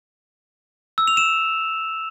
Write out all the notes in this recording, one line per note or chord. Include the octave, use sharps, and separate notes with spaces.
E6
F7
E7